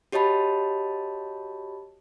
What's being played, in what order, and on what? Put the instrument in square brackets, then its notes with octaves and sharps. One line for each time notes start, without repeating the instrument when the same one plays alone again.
[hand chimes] F#4 G4 C#5 D#5 A5 B5